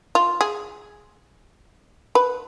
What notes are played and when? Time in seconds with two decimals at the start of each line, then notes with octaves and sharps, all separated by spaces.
0.15 F4
0.41 G#4
2.15 B4